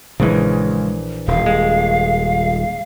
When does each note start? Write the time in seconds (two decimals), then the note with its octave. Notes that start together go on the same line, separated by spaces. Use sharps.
0.20 A#1 C#3 E3 G#3
1.28 D#1 F5
1.46 G#3